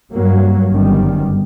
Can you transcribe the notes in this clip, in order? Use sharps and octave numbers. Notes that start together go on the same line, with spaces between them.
G2 F#3 A#3
G1 F#2 D#3 G3